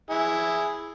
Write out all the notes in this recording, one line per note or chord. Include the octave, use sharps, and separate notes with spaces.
E4 G#4